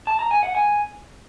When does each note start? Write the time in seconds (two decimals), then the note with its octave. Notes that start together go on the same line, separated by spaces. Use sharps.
0.07 A5
0.19 A#5
0.31 G#5
0.43 F#5
0.55 G#5